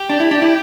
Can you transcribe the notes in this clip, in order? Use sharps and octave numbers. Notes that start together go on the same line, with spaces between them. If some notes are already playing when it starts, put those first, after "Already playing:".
Already playing: G4
D4
E4
D4
E4